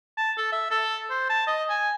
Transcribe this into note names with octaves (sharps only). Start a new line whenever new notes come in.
A5
A4
E5
A4
C5
A5
D#5
G#5